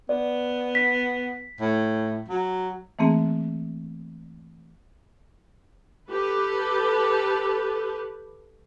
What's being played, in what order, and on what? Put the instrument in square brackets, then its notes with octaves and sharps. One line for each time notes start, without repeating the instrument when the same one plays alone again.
[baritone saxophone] B3 [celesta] D5
[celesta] B6
[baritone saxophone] A2
F#3
[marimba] E3 A3 A#3 C4 G#4
[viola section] G4 A4 B4